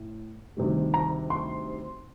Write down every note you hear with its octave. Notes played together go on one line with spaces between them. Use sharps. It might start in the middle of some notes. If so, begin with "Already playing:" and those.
Already playing: A2
D2 C3 D#3 G3
A#5
C6